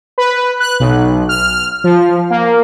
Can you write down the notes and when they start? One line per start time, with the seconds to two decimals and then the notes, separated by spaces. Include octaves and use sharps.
0.18 B4
0.60 F#6
0.80 B1
1.29 F6
1.84 F3
2.30 A#3